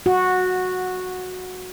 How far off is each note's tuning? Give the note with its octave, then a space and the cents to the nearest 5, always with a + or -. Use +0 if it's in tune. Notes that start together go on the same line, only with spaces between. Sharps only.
F#4 -10